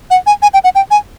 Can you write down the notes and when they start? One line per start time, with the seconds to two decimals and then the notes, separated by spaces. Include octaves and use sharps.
0.10 F#5
0.26 G#5
0.42 G#5
0.53 G5
0.64 F#5
0.75 G5
0.91 G#5